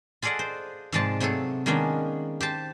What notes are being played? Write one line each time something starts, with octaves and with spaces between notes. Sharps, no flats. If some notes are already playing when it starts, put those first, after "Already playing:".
F4 G#4 A4 D5 D#5 F#5
C5
G#2 C3 F3 G#3 D5 A5
C3 F#3 A3 G#4 A4
D#3 G#3 A#3 B3 C#4 D4
G4 C5 A5